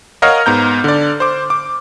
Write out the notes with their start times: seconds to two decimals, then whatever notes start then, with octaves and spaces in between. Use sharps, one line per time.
0.22 A#4 C#5 D#5 F5 F#5 F6
0.46 G#2 B3 A#5 G6
0.84 D3 D5
1.20 C5 D6
1.50 D6